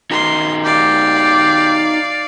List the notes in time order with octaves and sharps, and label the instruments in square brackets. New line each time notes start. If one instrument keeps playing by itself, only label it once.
[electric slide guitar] D#4 F#4 A#4 [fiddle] C6
[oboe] G4 [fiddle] D5 F5